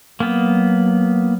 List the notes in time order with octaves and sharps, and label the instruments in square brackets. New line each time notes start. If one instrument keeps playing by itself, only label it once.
[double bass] F#3 [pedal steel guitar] A#3 B3